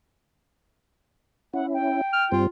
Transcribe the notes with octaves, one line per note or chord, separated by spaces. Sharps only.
C#4 E4 F#5
G5
F6
G2 G3 C4 F4